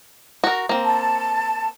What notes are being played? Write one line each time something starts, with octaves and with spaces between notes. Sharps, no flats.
F#4 A#4
A#3 C4
A5